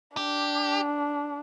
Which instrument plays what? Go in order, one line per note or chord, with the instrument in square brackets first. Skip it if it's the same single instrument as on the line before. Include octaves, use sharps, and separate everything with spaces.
[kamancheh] D4 [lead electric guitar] G4